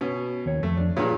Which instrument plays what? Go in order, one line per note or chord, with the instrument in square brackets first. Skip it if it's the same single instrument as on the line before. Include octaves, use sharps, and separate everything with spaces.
[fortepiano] B2 C#4
[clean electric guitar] D#2 C#5
[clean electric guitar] F2 [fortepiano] A3
[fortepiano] D4
[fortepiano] G2 A#2 [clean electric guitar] G#4 B4 C#5